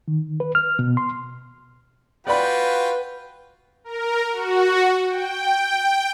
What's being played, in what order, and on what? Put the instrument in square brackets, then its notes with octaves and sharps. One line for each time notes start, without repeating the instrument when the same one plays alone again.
[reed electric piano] D#3
B4
F6
B2
C6
[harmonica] F4 F#4 G5 [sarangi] B4 [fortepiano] D5 B5
[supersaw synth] A#4
F#4
G5